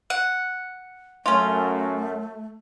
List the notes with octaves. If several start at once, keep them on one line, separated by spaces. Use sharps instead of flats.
F#5
F#2 A3 C#4 F4